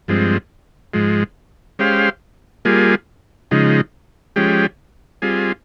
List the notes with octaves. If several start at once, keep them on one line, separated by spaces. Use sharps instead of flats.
G2 F3 G#3 C4
G#2 F3 G#3
G#3 C#4 G4 C5 F5
G3 A#3 F4 G#4
C#3 F3 G#3 D#4
F3 G#3 C#4 G4
G3 C4 F4 G#4